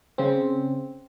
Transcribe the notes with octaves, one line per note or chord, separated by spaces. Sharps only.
C#3 C4